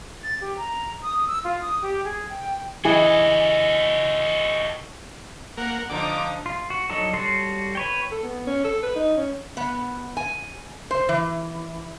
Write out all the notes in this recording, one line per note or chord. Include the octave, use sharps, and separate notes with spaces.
A6
G4
A#5
D#6
E6
F4
D#6
G4
G#4
G5
E3 F#4 G#4 A4 D#5 G5 G#5
A#3 A#4 F#5
D3 F3 D#4 D6
F4
F#4
F#3 D4 D#4 A4
G3 F#4 A4 C#5 C6
B4 C#5 G5
A4
B3
C#4
A4
B4
D#4
C#4
B3
G#5
C5
E3